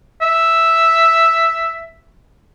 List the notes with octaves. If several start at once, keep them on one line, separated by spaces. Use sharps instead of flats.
E5